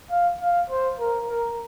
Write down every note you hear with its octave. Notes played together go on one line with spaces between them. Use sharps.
F5
F5
C5
A#4
A#4